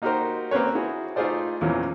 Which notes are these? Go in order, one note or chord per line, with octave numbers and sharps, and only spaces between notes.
A#3 D#4 F#4 G4 A#4 C5
A#3 C4 C#4 B4 C#5
E4 F#4 G#4
A3 D#4 F4 G#4 C5 D5
E2 A#2 E3 F3 C#4